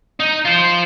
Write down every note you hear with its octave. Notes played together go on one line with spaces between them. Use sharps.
D#4
F4 C5